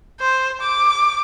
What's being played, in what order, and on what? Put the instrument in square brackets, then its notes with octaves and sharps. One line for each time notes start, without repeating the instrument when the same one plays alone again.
[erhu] C5
D6